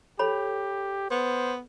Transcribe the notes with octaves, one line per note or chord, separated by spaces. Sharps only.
G4 A4 C#5 B5
B3 C5